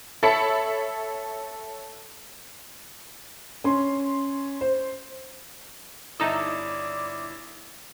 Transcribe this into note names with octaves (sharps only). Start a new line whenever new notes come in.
A4 C#5 E5 A5 B5 C#7
C#4 C6
C5
G1 D#4 E4 A4 D5 E5 D#6